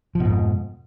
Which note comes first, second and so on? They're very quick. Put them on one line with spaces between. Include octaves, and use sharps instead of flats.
F3 B2 G#2 F2